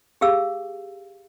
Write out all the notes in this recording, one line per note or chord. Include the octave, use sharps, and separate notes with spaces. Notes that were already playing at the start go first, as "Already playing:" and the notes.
G4 G#4 F5 E6